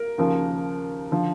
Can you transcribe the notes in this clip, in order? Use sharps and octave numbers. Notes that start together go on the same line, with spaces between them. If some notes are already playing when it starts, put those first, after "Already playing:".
Already playing: A#4
D#2 C#3 F3
D3 F3